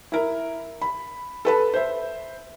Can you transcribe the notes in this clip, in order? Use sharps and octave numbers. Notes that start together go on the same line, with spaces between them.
E4 A#4
B5
A4 B4 A5
C5 E5